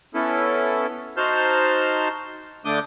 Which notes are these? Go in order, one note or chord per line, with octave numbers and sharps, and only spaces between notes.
B3 C#4 E4 A4
D#4 F#4 C5 A5 F6 G6
D3 A3 D4 D6 D#6 G6